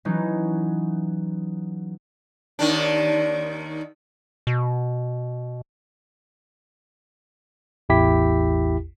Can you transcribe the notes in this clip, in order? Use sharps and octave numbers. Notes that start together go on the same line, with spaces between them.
E3 F#3 C#4 D#4
D#2 D#3 D4
B2
A1 E2 E4 G4 B6